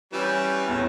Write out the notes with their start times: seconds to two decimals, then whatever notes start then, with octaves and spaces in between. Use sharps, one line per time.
0.13 E3 G3 C#4
0.68 E2 A2